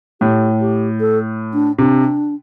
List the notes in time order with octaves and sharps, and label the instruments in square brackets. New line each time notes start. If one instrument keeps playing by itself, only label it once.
[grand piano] A2 [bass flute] G4
[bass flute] G4
A4
D4
[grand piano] C3 [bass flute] D4